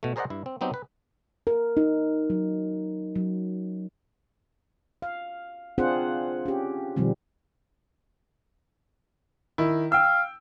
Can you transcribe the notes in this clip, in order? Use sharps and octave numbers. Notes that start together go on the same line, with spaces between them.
B2 A3
G#4 A#4 C5 D5 D#5 F#5
G2 E4
C4
F#3 B3 C4 D#4 G4
B4
A#4
D#4
F#3
F#3
F5
C4 D4 F4 G#4 C5 F#5
C#4 G4
B2 D#3 F3 G3 C4
D#3 E4
F5 G5 E6